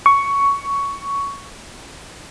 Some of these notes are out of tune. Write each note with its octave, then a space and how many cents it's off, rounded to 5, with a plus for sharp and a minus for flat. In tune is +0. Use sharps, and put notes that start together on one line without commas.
C#6 +10